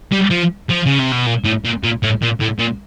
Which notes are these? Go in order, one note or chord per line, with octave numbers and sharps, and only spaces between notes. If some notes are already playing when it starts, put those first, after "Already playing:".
G3
F3
F3
C#3
C3
B2
A#2
A2
A#2
A#2
A2
A#2
A2
A#2